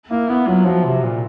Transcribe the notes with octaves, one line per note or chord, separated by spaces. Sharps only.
A#3 E4
B3 E4
F#3 F4
F3 F#4
C3
A#2